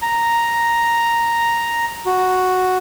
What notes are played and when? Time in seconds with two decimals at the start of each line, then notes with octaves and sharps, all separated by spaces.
0.02 A#5
2.06 F#4